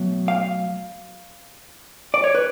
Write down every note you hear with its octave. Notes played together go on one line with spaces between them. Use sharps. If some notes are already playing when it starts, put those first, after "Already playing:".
Already playing: B2 F#3 A3
F5
D5
C#5
B4